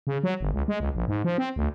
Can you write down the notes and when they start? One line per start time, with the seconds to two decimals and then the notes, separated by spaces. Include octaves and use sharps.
0.07 C#3
0.23 F#3
0.41 G1
0.53 C#2
0.68 G#3
0.80 C#2
0.95 A#1
1.08 G#2
1.24 F3
1.38 C4
1.56 D2